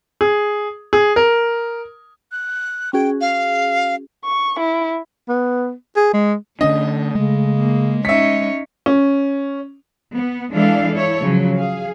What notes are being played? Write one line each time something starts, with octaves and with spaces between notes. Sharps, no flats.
G#4
G#4
A#4
F#6
C#4 F#4 G#4 G5
F5
C#6
E4
B3
G#4
G#3
D3 A3 C#4 D4 D#5
C#3 G#3
A#3
C#4 D#4 C#5 E5 B6
C#4
B3
E3 G#3 D4 E4 A4 F5
E4 A4 C#5
C#3 F3 F#3
G#4 F5